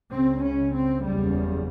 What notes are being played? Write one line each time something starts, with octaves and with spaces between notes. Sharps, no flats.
C#2 C#3 C4
C#4
C4
F#1 E2 C#3 G3